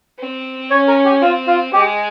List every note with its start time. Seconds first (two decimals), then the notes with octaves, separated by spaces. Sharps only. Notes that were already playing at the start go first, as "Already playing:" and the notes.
0.19 C4
0.71 C#4 C#5
0.88 A#4
1.05 G4
1.22 C4 F4
1.47 F4
1.73 G#3 G4